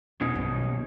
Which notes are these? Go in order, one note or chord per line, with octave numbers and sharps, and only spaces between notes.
D#2 B2 C#4 D#4
B1 G2
D#3 A#3